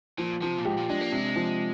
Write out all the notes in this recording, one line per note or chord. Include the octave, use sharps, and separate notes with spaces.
A#2 F3
C3 F3
A#2
G#2 G4
A#2
G#3 D4
A#3
C3 G#3
F3